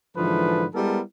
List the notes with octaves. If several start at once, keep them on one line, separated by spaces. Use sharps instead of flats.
G#2 D3 E3 F3 A4 B4
G3 G#3 B3 E4 A4 A#4